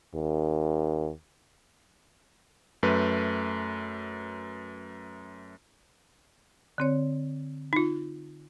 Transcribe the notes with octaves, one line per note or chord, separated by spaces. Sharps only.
D#2
F#2 A3 B4
D3 C4 C#5
D#4 F4